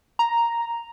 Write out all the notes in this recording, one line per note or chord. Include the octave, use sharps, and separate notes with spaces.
A#5